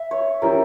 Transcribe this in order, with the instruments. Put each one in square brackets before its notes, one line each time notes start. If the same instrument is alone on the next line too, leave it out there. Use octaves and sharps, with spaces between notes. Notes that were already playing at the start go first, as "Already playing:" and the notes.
Already playing: [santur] E5
C#5
[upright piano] F3 C#4 E4 G4 [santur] A#4